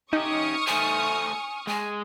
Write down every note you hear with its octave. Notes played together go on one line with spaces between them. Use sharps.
C#4 D#4 G4 C#6 D#6 F6
A3 C5 G#5
G#3 G#5